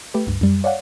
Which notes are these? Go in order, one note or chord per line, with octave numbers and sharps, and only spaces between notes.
A3 G4 B4
C#2 G2
F#2 G3
C#5 D5 F5 F#5